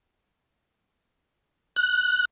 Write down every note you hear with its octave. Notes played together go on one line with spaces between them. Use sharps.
F#6